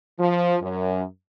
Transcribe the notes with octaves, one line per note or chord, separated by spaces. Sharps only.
F3
F#2